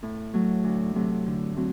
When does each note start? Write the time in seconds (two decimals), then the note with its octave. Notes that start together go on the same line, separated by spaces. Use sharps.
0.03 A2
0.34 F#3 A3
0.64 D2
0.94 C3 F#3 A3
1.26 D3
1.56 F#3 A3 C4 F#4